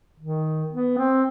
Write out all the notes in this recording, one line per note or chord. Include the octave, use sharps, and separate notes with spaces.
D#3
B3
C4